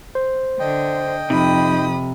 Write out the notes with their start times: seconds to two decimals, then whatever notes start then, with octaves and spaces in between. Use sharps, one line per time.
0.15 C5
0.60 D3 D#5 G5
1.30 F2 C3 D#4 B5 D#6